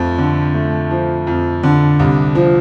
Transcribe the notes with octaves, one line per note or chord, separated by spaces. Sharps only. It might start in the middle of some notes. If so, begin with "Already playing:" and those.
Already playing: F2 F3 A3
D3
A3
F3
F2
D3
C2
F3